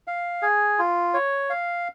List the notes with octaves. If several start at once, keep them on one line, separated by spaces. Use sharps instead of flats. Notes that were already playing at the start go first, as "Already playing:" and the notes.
F5
G#4
F4
C#5
F5